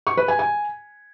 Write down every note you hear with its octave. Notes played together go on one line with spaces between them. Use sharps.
C#6
B4
G#5
G#5